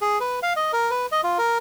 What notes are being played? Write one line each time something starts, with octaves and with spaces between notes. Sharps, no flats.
G#4
B4
F5
D#5
A#4
B4
D#5
F4
A#4